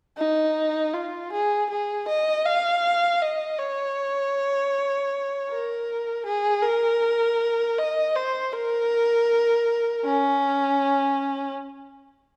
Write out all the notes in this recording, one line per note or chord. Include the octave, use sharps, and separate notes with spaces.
D#4
F4
G#4
G#4
D#5
F5
D#5
C#5
A#4
G#4
A#4
D#5
C5
A#4
C#4